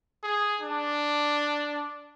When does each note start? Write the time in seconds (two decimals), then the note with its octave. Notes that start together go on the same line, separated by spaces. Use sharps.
0.23 G#4
0.61 D4